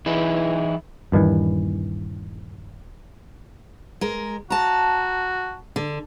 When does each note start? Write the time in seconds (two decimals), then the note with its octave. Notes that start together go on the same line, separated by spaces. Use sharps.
0.06 E3 D#4 E4 G#4
1.12 D#1 G2 D#3 E3
4.01 G#3 A#4
4.50 F#4 A5 A#5
5.76 D3